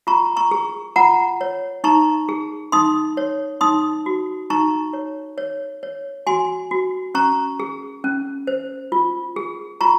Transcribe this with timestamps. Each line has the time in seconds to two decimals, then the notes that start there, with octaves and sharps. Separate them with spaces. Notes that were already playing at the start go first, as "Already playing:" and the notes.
0.07 F4 A#5 C#6
0.36 A#5 C#6
0.51 G#4
0.96 F4 F#5 A#5
1.41 C#5
1.84 D#4 A#5 C#6
2.29 G#4
2.72 D#4 C6 D#6
3.17 C#5
3.61 D#4 C6 D#6
4.06 F#4
4.50 D#4 A#5 C#6
4.93 C#5
5.38 C#5
5.83 C#5
6.27 F#4 G#5 C6
6.71 F#4
7.15 C#4 A#5 C#6
7.60 G#4
8.04 C#4
8.47 C5
8.92 F4
9.36 G#4
9.81 F4 A#5 C#6